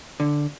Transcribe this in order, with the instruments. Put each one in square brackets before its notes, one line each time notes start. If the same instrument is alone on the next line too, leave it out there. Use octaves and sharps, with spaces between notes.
[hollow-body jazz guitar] D3